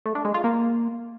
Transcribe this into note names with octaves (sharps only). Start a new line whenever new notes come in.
A3
D4
G#3
F4
A#3